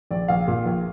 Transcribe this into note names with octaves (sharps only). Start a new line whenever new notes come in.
A#1 D5
A#1 F5
A#2
A#1